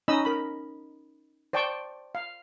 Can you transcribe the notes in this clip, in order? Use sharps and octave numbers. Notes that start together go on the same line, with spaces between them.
C#4 D#4 D#5 B5 E6
A#4 B5
C5 D5 G5 A5 C#6
F5